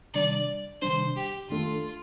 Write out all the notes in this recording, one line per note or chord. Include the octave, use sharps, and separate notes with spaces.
C3 D#3 G3 D4 D5
C3 D#3 G3 D4 C5
G4
F2 D#3 A3 D4 F4 A4